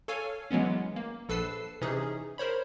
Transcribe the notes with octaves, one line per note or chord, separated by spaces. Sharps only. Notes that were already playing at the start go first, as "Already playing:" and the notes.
A4 C#5 F5 G#5
E3 F#3 G#3 B3 C#4
A#3
A#1 A4 B4 E6 C7
C3 E3 C#4 D#4 G#4
A#4 C5 C#5 B5